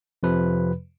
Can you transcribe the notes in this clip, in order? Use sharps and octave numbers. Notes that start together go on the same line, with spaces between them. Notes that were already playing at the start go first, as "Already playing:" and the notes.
F2 C3 F3 B4